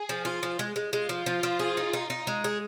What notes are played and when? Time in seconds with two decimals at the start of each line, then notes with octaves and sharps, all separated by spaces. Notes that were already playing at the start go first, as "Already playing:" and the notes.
Already playing: G#4
0.09 F3
0.25 F4
0.43 F3
0.59 G#3
0.76 G#3
0.93 G#3 F4
1.09 F3
1.26 F3
1.43 F3
1.59 G#4
1.77 D#4
1.93 D#4
2.10 D#4
2.27 G#3
2.44 G#4